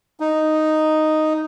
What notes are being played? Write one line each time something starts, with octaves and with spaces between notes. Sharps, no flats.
D#4